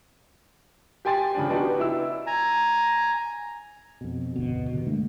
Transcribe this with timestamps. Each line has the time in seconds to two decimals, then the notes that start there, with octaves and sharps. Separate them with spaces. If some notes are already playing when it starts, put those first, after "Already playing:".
1.05 G4 G5 G#5 C6 A6
1.35 C#3 F3 D4
1.49 B3 D4 D#4 F#4 G4 B4
1.80 E4 E6
2.27 G#5 A#5
4.01 F2 B2
4.36 G1 D2 B2
4.71 G#2 C3 D#3
4.87 D3 G#3 A3 D4